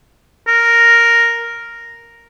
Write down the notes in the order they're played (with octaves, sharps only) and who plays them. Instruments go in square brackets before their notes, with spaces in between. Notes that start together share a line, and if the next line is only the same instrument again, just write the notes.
[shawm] A#4